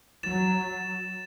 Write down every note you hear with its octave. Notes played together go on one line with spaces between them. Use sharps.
F#3 A6 E7